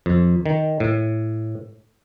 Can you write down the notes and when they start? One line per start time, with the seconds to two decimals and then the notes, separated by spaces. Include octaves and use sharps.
0.06 F2
0.46 D#3
0.80 A2